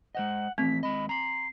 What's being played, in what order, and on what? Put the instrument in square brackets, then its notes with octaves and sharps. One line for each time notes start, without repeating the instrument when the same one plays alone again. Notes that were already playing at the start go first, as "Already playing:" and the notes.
[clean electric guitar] G#3 C5 D#5 [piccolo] F#5
[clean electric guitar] E3 F3 A3 [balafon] C4 [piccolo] B6
[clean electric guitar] D#2 G#3 D#5 [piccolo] B5
[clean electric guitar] A#5 C6 [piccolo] C7